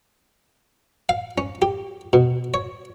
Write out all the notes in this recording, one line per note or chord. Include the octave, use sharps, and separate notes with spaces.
F5
C#4
G4
B2
C#5